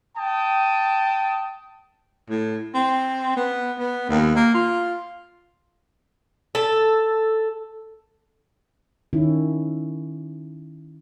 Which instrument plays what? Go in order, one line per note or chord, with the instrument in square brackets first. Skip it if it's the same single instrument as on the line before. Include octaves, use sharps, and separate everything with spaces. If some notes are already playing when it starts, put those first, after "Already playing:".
[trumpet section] G5 A5 D#6
[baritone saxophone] A2
C4
B3
B3
D#2
A#3
F4
[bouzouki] A4
[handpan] D#3 C#4 E4